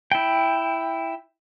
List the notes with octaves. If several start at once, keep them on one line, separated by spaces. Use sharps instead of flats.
E4 G5